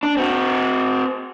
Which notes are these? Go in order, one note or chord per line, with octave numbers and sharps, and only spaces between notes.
D4
C4 F#4